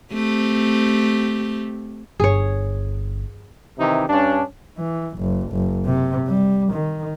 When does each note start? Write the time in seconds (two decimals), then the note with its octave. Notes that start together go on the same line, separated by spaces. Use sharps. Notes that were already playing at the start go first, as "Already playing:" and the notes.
0.13 A3 C4 G4
2.20 G1 G#4 C#5
3.78 C3 D#3 E3 D#4 G4
4.09 G2 C#4 D4
4.78 E3
5.18 F#1
5.52 F#1
5.85 C3
6.27 G3
6.72 D#3